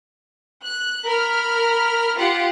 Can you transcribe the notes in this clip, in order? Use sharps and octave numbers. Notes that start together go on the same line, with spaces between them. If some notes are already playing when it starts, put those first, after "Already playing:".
F#6
A#4 B5 F6
F4 G4 F#5